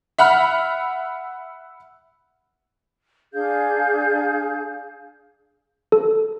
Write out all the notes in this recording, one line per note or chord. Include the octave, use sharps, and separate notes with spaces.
E5 F#5 B5 F6
D4 G#4 F5 G6
A4